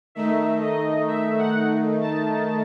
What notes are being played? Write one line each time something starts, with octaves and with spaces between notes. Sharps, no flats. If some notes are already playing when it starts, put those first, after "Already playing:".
D#3 A3 D#4 E5
D#5
E5
F#5
A5